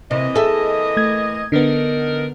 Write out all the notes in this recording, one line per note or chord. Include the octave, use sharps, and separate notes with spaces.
C3 E3 A#3 D#5
G#4 A4 E5
A3 G#6
D3 B3 D4 D#4 A#4